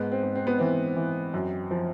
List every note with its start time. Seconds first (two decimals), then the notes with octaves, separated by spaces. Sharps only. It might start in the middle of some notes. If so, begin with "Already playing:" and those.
Already playing: G#2 B3
0.12 C4
0.23 G#2
0.36 C4
0.47 B3
0.59 E3 C4
0.96 E3
1.34 F#2
1.71 F3